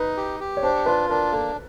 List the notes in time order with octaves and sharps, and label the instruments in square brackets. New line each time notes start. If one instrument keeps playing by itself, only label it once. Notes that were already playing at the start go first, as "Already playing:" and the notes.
Already playing: [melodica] D#4 [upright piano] B4
[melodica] G4
G4
[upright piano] C#5
[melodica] D4 [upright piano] C5
[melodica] F4 [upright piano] B4
[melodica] D4 [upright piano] A#4
[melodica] A#3 [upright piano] A4